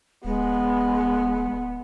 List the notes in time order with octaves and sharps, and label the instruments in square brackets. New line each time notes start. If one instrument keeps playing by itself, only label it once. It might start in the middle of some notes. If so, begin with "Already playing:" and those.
[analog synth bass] D1 [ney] G#3 [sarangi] B3